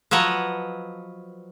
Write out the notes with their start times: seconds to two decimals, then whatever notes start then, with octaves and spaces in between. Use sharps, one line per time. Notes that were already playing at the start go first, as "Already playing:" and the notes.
0.11 F3 F#3 B4 C#5 D#5